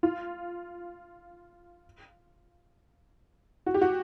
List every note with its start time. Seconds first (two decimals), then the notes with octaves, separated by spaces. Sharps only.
0.03 F4
3.66 F#4
3.74 G4
3.81 F#4